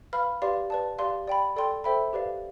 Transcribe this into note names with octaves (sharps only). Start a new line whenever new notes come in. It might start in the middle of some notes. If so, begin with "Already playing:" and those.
B4 F5 B5 F6
G4 B4 D5 F5 C6
B4 D5 A5
G4 D5 F5 C6
D5 G5 B5
A4 D5 G5 C6
A4 C5 E5 G5 B5
G4 B4 D5 F5